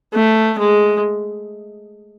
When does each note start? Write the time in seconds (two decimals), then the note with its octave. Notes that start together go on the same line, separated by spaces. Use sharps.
0.14 A3
0.58 G#3